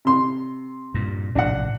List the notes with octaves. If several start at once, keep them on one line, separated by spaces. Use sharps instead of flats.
C3 C6
G2 A#2
A#1 A2 C3 D4 F#5